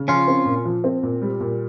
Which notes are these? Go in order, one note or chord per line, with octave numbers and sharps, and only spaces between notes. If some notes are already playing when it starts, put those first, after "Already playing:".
Already playing: C#3
F3 C#4 F4
C4
A#2
F3
C4
A#2
G3
A#2